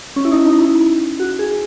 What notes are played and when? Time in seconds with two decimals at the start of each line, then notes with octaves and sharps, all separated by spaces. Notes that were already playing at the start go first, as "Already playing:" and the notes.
0.16 C#4
0.25 E4
0.32 D#4
0.46 D#4
0.61 E4
1.20 F#4
1.39 G#4